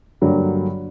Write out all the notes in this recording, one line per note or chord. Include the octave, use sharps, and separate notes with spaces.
G2 D3 F#3 A#3